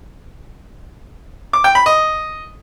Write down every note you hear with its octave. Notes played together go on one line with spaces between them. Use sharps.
D6
G5
B5
D#5